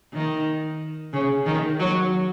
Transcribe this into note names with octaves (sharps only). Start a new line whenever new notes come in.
D#3
C#3
D#3
F#3